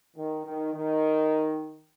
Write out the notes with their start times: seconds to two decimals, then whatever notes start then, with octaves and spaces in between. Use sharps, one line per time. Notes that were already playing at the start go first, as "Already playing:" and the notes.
0.16 D#3
0.45 D#3
0.73 D#3